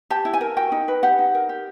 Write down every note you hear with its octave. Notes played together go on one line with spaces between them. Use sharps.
G4 A5
E4
G#5
A#4
F#4 G5
D#4
B4
G4 F#5
D#4
A#4
G4